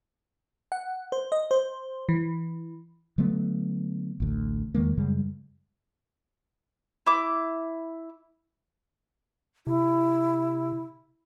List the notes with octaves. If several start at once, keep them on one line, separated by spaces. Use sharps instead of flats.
F#5
C5
D#5
C5
E3
D3 F#3 A3 B3
A1 D2
E2 D#3 G#3 A#3
F#2 C#3 G3 G#3
E4 D6
C3 E4